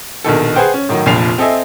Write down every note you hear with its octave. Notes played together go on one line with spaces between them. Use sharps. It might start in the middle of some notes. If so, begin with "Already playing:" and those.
A#1 B2 D#3 A4
G#4 B4 C5 F#5 G5
C#4
A2 D#3 F#3
F1 A#1 A#2 F3 C7 F7
C4 A4 D#5 E5 G#5